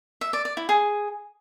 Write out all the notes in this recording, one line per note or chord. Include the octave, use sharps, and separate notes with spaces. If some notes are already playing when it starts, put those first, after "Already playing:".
E5
D5
D5
E4
G#4